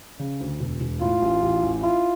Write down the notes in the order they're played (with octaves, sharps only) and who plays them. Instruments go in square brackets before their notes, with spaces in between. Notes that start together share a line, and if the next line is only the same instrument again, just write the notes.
[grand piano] C#3
D2
E1
E1
[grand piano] A2 [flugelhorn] F4
[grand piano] A1
A1
A1
[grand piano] E4 [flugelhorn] F4